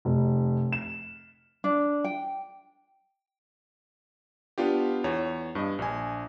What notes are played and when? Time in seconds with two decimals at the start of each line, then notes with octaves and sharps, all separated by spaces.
0.05 F1
0.73 E7
1.64 D4
2.04 G5
4.58 B3 D4 F4 G4
5.04 E2 C#5
5.55 G2 D#5
5.79 A#1 G#5